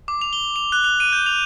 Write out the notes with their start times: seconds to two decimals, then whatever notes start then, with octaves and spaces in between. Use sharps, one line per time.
0.08 D6
0.21 F7
0.33 G7
0.56 F7
0.72 F#6
0.84 F7
1.00 D#7
1.13 G6
1.26 F7